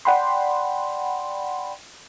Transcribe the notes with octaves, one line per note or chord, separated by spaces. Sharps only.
D5 F#5 G5 B5 C6